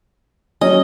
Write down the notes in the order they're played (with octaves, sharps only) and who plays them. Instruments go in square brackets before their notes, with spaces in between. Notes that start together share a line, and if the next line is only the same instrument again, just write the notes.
[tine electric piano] F#3 C#4 [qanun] D#5